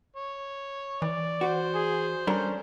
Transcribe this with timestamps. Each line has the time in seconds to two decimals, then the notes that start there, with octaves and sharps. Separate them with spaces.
0.16 C#5
1.02 E3 D5
1.41 F#4 C5
1.74 G#4
2.27 G3 C#4 D4 A4 A#4